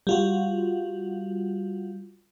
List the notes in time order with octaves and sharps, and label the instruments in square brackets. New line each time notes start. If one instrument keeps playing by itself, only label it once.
[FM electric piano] G3 F4 F#4